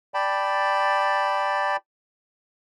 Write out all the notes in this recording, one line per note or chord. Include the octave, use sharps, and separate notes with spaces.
D5 G5 A5 B5